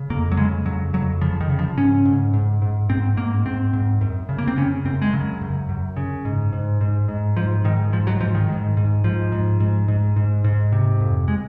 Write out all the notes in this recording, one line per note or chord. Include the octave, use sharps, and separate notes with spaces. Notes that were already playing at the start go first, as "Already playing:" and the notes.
Already playing: C#3
F2 A#3
F#3
C#3 G#3
F2 F#3
F2 F#3
C#3 F3
D#3
C#3
F3
G#2 C#4
G#2
G#2
G#2
G#2 C4
G#2 A#3
G#2 C4
G#2
F#2
C#3
A#3
C4
C#3 C#4
F#2 C4
G#3
C#3 F#3
F#2
F#2
C#3
G#2
G#2
G#2
G#2
G#2 F3
G#2 D#3
G#2 F3
F#3
G#2 F3
D#3
G#2
G#2
G#2 F3
G#2
G#2
G#2
G#2
G#2
C3
F2
G#3